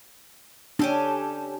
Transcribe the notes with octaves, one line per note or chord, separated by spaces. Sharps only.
C#4 D4 G4 A4